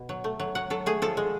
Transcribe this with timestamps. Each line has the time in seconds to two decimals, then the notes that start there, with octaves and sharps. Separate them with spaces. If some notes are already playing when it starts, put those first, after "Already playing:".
Already playing: B2
0.09 F#3
0.24 A3
0.39 F#3
0.55 F#3 F#5
0.70 F#3 A4
0.86 A3 G#4
1.02 F3 A4
1.17 G#3